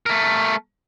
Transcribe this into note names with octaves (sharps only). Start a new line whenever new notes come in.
A3 A#4